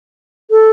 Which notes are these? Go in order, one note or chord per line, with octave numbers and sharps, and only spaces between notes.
A4